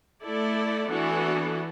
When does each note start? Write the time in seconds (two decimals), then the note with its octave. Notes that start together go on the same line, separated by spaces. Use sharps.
0.23 A3 E4 A4 D5
0.88 E3 B3 D4 F#4 A4